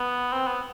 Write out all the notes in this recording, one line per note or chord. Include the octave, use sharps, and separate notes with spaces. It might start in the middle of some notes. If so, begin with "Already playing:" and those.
Already playing: B3
C4
B3